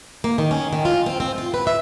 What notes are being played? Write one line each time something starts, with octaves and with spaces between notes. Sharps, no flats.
A#3
D#3
C#4
D#3
F4
C4
C4
F4
B4
E5